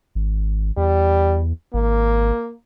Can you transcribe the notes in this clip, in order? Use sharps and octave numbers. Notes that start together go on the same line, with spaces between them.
G#1
E2 G3
G#1 A#3